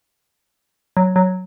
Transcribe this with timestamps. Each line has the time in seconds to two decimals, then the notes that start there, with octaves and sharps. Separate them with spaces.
0.97 F#3
1.16 F#3